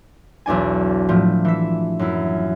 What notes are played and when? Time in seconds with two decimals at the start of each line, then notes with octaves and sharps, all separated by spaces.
0.46 B1 E2 D4 G#5
1.09 A2 F3 A3
1.45 E3 E5
1.99 F#2 E4